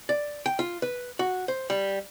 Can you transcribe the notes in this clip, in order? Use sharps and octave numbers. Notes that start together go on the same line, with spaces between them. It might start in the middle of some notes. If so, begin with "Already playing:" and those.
D5
G5
F4
B4
F#4
C5
G3